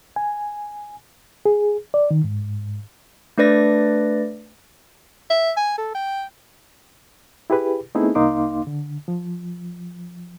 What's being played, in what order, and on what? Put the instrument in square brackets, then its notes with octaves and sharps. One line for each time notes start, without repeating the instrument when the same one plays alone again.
[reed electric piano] G#5
G#4
D5
D#3
G#2
[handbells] A3 D4 B4 D5 A#6
[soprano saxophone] E5
G#5
A4
G5
[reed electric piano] E4 G4 G#4 B4
A3 B3 C4 D#4 E4 G#4
C2 A#3 D#4 F5 C6 D6
D3
F3